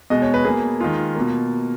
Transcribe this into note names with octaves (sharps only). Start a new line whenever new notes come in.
B2 G#3 D#5
C#5
B4
B2 A#3 G#4
D#3 G#3 F4
B2 A#3